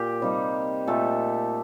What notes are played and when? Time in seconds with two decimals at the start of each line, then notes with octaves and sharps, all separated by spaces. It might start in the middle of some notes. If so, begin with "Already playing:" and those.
Already playing: A#2 G4
0.21 C3 G3 A#3 D#4
0.87 A#2 A3 D#4 A4